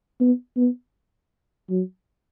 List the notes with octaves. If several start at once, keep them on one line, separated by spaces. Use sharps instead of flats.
B3
B3
F#3